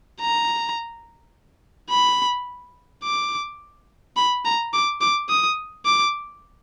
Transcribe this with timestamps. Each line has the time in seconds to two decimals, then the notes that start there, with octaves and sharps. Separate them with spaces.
0.21 A#5
1.91 B5
3.04 D6
4.17 B5
4.45 A#5
4.73 D6
5.01 D6
5.29 D#6
5.86 D6